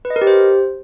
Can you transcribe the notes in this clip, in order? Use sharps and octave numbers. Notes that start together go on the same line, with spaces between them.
B4
D#5
A#4
G4
C5